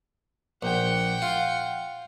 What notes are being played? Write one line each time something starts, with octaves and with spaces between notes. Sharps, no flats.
A#1 F#5 G5
F4